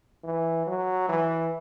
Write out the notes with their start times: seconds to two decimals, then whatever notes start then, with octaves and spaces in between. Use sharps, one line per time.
0.24 E3
0.67 F#3
1.09 E3